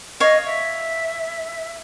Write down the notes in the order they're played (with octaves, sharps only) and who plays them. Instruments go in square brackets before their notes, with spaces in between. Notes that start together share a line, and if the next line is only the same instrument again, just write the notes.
[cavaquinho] C#5 F5 [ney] D#5
[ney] E5